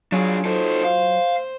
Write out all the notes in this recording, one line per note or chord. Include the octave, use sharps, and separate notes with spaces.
F#3 D4 F4 G#4 C#5
D#4 A4 C5
F5